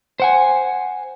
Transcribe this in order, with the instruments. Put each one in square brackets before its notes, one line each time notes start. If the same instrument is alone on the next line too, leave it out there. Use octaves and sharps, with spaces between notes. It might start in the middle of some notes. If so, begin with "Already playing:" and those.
[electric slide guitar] C5 F#5 G#5